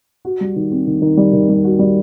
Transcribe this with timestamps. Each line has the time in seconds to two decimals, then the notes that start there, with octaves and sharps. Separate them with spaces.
0.25 F#4
0.41 G3
0.56 D#3
0.71 C4
0.87 D#3
1.02 D#3
1.17 G3
1.33 D#3
1.49 G3
1.64 F#4
1.79 G3